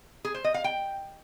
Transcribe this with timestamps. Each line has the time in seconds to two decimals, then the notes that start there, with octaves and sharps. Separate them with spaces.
0.25 G#4
0.34 C5
0.44 D#5
0.54 F5
0.64 G5